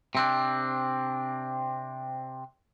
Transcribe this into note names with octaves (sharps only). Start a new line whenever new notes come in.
C3 C4 D4